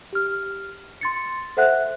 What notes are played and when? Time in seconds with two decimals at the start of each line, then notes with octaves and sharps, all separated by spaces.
0.13 G4 F6
1.01 C6 A6 C#7
1.57 A4 C5 E5 F#5 F#6